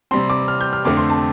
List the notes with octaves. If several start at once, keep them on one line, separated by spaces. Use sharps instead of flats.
C3 G3 C4 C6
D6
F6
G6
F6
F2 D3 A3 C4 D6
C6
A5